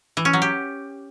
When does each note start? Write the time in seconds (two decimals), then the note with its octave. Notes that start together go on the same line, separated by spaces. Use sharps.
0.17 E3
0.25 C#4
0.33 F#3
0.42 G4